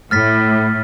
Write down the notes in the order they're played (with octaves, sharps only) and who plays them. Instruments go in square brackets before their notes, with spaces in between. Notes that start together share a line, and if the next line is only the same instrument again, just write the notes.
[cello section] A2 [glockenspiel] F6 A6 B6